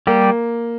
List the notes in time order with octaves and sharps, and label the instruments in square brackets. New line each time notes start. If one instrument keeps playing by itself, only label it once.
[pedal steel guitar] G3 G4 [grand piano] A#3